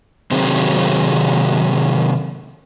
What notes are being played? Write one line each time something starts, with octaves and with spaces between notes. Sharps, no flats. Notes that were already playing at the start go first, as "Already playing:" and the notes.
C3 D#3 F#3 C4 G#4